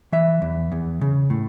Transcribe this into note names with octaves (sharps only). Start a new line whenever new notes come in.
E3 E5
E2
E2
C#3
A2